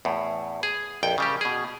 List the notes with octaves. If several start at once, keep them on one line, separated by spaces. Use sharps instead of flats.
E2 A2
G#4
A#1 F2 G5
C#3 G3 G4
B2 G#4